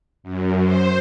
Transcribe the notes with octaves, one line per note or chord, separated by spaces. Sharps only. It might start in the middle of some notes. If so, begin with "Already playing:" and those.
F#2
C5